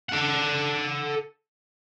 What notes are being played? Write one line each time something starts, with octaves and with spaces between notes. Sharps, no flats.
A4 F#5